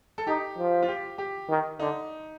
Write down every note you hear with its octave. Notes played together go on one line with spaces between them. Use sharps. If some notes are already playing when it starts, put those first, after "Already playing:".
A4
D#4 G4
F3
F4
G4
G4
D#3
D3 D#4